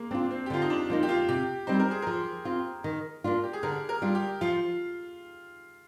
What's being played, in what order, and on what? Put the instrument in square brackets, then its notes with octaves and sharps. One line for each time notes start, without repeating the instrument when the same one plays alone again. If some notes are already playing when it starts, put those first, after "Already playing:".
Already playing: [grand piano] G#3 A#3
[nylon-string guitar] C4 F4 [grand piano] D4
[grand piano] C4
G4
[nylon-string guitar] D3 [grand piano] F4
[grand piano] D#4
D4
[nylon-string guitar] F3 A#3 D#4
[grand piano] G4
F4
[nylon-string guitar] C3 [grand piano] G4
[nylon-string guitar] G3 C4 D#4 [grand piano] C5
[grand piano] A#4
G#4
[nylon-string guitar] F3 [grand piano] A#4
[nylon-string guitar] C4 F4
D#3
A#3 D4 F4
[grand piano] G4
G#4
[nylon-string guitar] D3 [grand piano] A#4
[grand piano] A#4
[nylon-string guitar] G3 D4 F4
[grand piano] G4
[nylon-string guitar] F3 [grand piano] F4